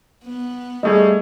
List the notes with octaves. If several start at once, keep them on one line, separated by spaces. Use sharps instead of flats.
B3
G3 A3 G#4 D#5